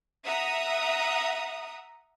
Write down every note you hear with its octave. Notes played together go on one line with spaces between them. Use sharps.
E5 F#5 A#5 D#6